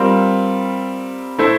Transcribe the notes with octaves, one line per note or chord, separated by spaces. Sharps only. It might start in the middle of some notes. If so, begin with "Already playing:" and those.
Already playing: G3 C4 F4 A#4
A3 E4 A4 C5